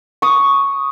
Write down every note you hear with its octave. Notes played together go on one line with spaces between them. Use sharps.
C#6 D#6